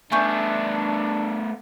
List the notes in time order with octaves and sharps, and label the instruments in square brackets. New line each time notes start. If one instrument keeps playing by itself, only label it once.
[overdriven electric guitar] A3 B3 [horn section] D4 [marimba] G#5 C#6 G6